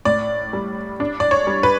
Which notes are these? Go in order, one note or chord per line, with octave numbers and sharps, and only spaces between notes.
A2 D5
G3
D4
D5
C#5
G3
B4